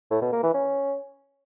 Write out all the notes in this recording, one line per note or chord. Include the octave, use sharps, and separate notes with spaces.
A2
B2
A#3
E3
C#4